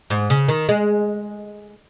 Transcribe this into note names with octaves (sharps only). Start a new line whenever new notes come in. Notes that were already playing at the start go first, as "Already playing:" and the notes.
G#2
C#3
D#3
G#3